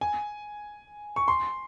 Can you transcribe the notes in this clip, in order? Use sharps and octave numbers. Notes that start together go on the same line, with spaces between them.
G#5
C#6
C6